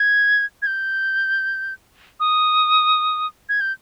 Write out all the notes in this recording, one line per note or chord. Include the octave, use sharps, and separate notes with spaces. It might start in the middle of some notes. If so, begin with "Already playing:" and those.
Already playing: G#6
G#6
G6
D#6
G#6
G6